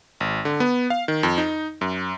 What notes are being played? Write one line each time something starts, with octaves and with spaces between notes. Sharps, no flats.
G#1
D3
B3
F5
D#3
F2
D#4
F#2